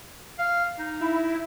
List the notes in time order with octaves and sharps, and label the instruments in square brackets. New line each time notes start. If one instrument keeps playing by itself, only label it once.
[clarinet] F5
D#4
[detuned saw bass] E4